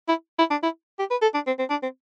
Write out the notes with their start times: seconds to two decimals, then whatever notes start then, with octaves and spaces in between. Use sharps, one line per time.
0.08 E4
0.39 E4
0.51 D4
0.63 E4
0.99 G4
1.11 B4
1.22 A4
1.34 D4
1.47 C4
1.59 C4
1.70 D4
1.83 C4